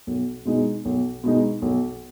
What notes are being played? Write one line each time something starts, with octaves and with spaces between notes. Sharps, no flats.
B1
B2 G#3 D#4
B1
B2 G#3 D#4
B1